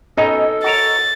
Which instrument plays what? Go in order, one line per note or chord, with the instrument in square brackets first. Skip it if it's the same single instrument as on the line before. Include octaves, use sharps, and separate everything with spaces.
[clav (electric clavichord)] B2 C#4 D#4 [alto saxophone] A4 [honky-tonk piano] D#5
[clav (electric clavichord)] F#4 A#4 C#5 [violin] A6